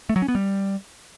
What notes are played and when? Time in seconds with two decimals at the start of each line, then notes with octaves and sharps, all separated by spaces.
0.09 A3
0.16 F#3
0.22 C#4
0.28 B3
0.35 G3